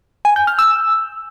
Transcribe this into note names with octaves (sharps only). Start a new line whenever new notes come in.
G#5
G6
F6
E6